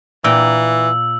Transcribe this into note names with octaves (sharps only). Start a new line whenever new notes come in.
A#2 E3 G5 A#5 E6